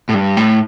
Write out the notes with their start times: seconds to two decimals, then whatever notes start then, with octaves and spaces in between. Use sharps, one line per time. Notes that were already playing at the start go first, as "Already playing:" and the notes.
0.09 A2
0.14 G2
0.37 A2